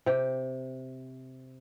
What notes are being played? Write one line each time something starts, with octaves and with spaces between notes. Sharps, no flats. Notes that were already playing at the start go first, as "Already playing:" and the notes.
C3 G4